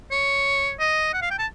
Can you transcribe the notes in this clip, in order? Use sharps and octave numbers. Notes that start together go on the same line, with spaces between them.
C#5
D#5
F#5
F5
G5
A5